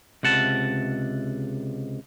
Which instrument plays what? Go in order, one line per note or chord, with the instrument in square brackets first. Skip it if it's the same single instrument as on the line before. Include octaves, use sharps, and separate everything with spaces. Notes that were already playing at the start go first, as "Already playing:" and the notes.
[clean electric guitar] C#2 C3 F#5 A5